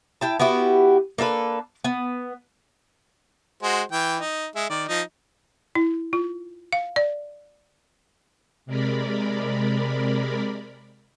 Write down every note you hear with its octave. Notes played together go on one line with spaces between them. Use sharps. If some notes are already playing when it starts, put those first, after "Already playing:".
E4 G5 A5
B3 E4 F#4 G4
A#3 D4 A4 B4
B3
G#3 F#4 C5
E3 G5
D#4
G#3 E5
D#3 D5
F3 D#4
E4
F4
F5
D5
C3 G#3 A#4 D5 B5